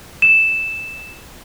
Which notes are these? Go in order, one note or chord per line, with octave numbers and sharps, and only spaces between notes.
E7